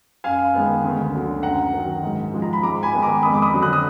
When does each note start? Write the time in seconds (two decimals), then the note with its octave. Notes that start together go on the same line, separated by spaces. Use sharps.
0.24 F#2 F5 G#5
0.54 D#3 G#3 B3
0.84 D2
1.14 D3 F#3
1.43 F#2 F#5 A#5
1.74 D#3 F#3
2.03 G#2
2.34 F3 G#3
2.42 A#5
2.53 B5
2.63 G#2 A#5 D6
2.83 G#5 B5
2.93 D#3 G#3 B3
3.02 A#5 D6
3.22 F2 B5 D#6
3.34 D6
3.42 B5 D#6
3.53 D3 F#3
3.62 D#6 F#6
3.73 D#6